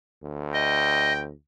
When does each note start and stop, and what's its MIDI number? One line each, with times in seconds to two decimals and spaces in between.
0.23 1.32 38
0.54 1.12 75
0.54 1.24 79